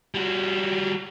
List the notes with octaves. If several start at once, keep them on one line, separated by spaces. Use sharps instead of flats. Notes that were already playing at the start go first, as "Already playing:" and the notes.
G3 F#4